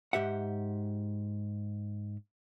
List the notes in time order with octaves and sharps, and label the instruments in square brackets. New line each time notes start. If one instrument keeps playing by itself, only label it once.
[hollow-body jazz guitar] G#2 G4 E5 F#5